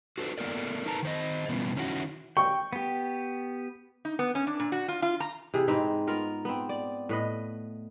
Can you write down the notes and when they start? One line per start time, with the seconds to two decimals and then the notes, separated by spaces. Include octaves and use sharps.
0.18 F#4 A4 B4 C5
0.38 A#3 B3 A4 A#4 D5
0.86 D#4 A#4 B4 A5 A#5
1.03 D#3 C5 D#5
1.49 B2 E3 G3 A#3 B3 C#4
1.76 D#3 C#4 E4 F#4
2.37 G5 C#6
2.73 B3 G4
4.05 D#4
4.19 B3
4.35 C#4
4.47 D4
4.59 A#2
4.72 F#4
4.88 F4
5.02 F4
5.20 A#5
5.54 C3 E3 G#4
5.68 G#2 C4 D#4 B4
6.07 B3 F4 A#4
6.45 B3 C4
6.69 D5
7.09 A2 B4 D#5